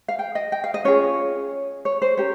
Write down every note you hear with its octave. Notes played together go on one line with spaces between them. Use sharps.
F5
G5
D#5
G5
F5
D#5
C#4 F4 G#4 C#5
C#5
C5
C#4 G4 A#4 C#5